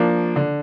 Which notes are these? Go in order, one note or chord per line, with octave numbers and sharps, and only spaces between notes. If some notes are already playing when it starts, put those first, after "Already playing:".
Already playing: F3 A#3 D4
D3